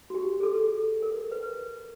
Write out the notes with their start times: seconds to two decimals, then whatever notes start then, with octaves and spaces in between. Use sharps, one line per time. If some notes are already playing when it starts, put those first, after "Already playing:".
0.10 F#4
0.15 G4
0.40 G#4
0.43 A4
1.02 A#4
1.31 B4